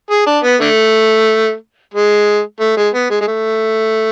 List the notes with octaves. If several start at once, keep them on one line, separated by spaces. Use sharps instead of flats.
G#4
D4
B3
D3 A3
G#3
A3
G#3
B3
G#3
G#3
A3